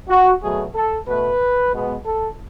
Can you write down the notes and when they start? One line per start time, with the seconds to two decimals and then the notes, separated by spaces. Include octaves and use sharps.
0.09 F#4
0.42 B2 F#3 A3 G#4
0.75 A4
1.07 B2 A3 B4
1.73 B2 G#3 B3
2.05 A4